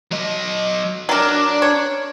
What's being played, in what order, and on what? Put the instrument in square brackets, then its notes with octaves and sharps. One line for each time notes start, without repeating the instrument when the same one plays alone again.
[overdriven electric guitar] F#3 D#5
[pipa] F#3 A#4 [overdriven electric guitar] D4 D5
[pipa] C#5